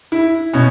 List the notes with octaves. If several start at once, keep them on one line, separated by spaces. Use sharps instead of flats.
E4
B2 C#4